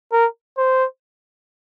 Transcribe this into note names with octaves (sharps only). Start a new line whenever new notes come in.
A#4
C5